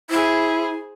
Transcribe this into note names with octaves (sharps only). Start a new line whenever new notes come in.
E4 G#4 C5